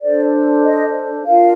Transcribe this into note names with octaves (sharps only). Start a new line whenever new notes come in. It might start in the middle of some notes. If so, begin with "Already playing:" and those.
D4 A4 C5 D5
D#5
D4 F4 A#4 F5